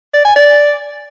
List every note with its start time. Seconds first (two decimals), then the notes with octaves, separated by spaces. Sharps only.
0.14 D5
0.25 G#5
0.36 D5